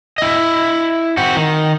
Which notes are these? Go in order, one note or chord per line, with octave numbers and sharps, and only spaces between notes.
E4 D#5
C4 F#4
D#3